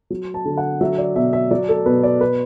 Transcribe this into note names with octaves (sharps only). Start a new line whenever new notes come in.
F#3
A5
D3
F#5
F#3 E5
D5
B2 E5
E5
F#3 D5
A4
B2 B4
D5
B4